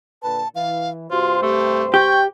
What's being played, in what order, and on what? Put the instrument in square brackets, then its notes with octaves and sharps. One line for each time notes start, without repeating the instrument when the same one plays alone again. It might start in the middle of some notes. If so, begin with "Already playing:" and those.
[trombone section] A#2 D3 B4 [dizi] A5
[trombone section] E3 [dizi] F5
[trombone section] G2 C3 C5 [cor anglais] F4 [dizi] F#4
[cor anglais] A3 [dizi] G4
[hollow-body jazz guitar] G4 [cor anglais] G5 [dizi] C#6